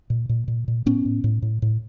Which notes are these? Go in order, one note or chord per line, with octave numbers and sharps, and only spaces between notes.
A#2
A#2
A#2
A#2
A2 B3 C#4
A2
A2
A2
A2